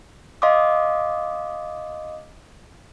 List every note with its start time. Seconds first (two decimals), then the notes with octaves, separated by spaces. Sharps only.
0.42 D#5 F5 C6 D6 D#6